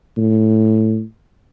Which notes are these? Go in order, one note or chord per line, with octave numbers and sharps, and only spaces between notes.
A2